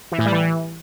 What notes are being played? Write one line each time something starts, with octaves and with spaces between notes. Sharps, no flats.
E3
A2
G3
E3